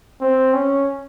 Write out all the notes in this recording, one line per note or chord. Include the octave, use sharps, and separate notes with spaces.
C4
C#4